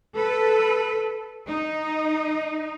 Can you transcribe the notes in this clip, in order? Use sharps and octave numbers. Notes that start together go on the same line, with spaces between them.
A4 B4
D#4